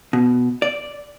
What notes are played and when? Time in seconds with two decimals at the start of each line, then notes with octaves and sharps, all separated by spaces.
0.13 B2
0.62 D5